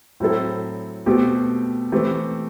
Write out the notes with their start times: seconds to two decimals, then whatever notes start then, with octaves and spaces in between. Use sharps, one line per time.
0.20 A2 F#3 C4 E4 A4
1.06 B2 A3 C4 G4
1.92 E3 A3 C4 G4 B4